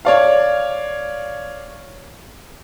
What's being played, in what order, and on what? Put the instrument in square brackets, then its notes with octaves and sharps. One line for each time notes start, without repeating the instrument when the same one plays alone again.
[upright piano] C#5 D5 F5